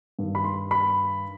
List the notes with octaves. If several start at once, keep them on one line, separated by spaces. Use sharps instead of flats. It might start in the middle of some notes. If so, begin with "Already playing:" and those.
G2 D#3
B5
C6
B5